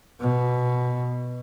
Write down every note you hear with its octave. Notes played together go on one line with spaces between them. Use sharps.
B2